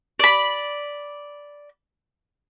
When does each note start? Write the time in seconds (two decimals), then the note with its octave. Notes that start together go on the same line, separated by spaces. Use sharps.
0.19 D5 B5